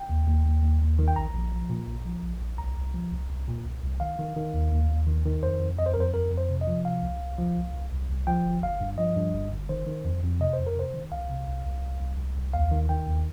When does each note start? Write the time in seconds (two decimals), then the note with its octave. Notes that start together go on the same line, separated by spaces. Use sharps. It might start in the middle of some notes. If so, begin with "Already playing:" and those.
Already playing: G5
0.09 D#2
0.28 D#2
0.45 D#2
0.63 D#2
0.81 D#2
0.99 D#3
1.08 G5
1.16 A#1 A#5
1.34 A#1
1.52 F3
1.70 A#2
1.87 A#1
2.05 F3
2.23 A#1
2.40 A#1
2.58 C2 A#5
2.77 C2
2.94 F3
3.11 C2
3.30 C2
3.48 A#2
3.65 C2
3.83 C2
4.00 D#3 F5
4.18 D#3
4.36 D#3
4.54 D#2
4.72 D#2
4.89 D#2
5.07 D#3
5.26 D#3
5.43 F2 C5
5.60 F2
5.79 F2 D#5
5.86 C5
5.94 A#4
5.96 F2 C5
6.14 F2 A#4
6.31 F2
6.38 C5
6.49 C3
6.61 D#5
6.67 F3
6.85 C3 F5
7.02 C2
7.20 C2
7.38 F3
7.56 C2
7.74 C2
7.92 C2
8.09 C2
8.27 F3 G5
8.45 G1
8.62 G1 F5
8.81 G2
8.98 F3 D#5
9.16 G2
9.34 G1
9.51 G1
9.69 D#3 C5
9.87 D#3
10.05 F2
10.23 F2
10.40 C3 D#5
10.53 F2 C5
10.67 A#4
10.76 C3 C5
10.94 D#3
11.12 C2 F5
11.29 C3
11.47 C2
11.65 C2
11.83 C2
12.00 C2
12.18 C2
12.36 C2
12.54 D#2 F5
12.72 D#3
12.89 D#3 G5
13.07 D#2